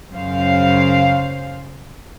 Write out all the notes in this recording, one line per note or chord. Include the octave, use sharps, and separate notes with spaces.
F#2 C#3 C5 F5